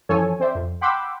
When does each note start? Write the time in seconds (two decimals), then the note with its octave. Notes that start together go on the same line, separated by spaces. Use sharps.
0.09 F#2 E3 F3 A4 C#5 G#5
0.40 C4 C5 D5 E5
0.55 F2
0.81 F#5 G5 B5 C6 D6 E6